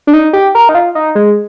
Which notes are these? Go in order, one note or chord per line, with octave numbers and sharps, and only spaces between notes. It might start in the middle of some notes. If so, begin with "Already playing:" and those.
D4
D#4
G4
A#4
D#4
F4
D#4
G#3